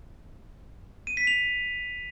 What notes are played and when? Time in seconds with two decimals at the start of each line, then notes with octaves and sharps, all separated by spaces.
1.07 D#7
1.17 B6
1.27 F7